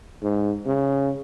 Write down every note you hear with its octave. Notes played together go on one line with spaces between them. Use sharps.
G#2
C#3